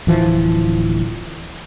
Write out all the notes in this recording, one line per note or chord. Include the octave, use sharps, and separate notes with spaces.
D1 E3 F3